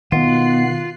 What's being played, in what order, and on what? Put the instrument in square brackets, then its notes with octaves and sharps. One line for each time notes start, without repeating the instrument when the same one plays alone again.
[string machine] B2 F#6 C7 [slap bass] D#3 [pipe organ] B3 [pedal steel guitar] F4